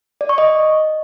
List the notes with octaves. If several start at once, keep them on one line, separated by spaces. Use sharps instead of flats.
D5
C#6
D#5